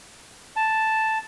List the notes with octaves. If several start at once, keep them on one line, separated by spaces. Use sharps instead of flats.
A5